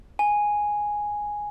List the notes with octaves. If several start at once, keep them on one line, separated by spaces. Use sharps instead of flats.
G#5